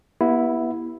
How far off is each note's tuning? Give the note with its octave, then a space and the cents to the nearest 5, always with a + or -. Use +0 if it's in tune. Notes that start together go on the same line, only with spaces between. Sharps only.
B3 -30 E4 +0 G4 +0